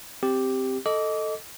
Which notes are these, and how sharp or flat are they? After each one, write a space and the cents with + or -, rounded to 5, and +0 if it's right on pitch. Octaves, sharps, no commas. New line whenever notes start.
C4 +0 G4 +0
A4 +0 D#5 +0 D6 -25